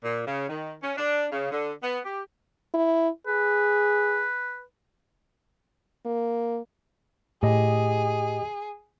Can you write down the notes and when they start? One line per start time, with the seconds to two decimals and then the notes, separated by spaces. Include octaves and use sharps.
0.04 A#2
0.26 C#3
0.49 D#3
0.82 C#4
0.98 D4
1.32 C#3
1.52 D3
1.83 B3
2.04 G4
2.74 E4
3.27 G#4 B4
6.06 A#3
7.43 A2 G4 G#4 D#5